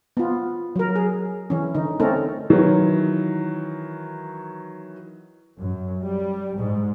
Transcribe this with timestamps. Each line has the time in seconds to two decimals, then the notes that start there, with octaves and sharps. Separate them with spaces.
0.17 B3 F4
0.76 F#3 A#4
0.96 G#4
1.50 E3 C#4
1.75 D3 D#4
2.00 A3 C4 C#4 D#4 A4 A#4
2.50 D#3 E3 F#3
5.59 F#2
6.03 G3
6.59 G#2